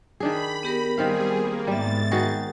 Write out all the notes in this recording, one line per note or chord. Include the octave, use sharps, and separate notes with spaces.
D#3 D4 G#4 B5
B3 G4 A#4
D#3 G3 C4 G#4 F5
A#3
G#2 G3 B3 E5 A6
D#3 F#4 G#4